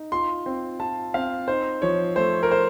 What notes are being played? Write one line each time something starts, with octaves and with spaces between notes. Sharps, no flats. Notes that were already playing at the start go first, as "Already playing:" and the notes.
Already playing: D#4
F4 C6
C4
F4 A5
C4 F5
D#4 C5
F3 C#5
A3 C5
A#4
C5